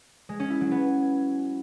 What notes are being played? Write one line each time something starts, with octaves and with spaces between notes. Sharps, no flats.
G#3
C#4
E4
F#3
B3